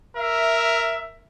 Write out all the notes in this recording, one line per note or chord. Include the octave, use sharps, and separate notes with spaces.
A#4 E5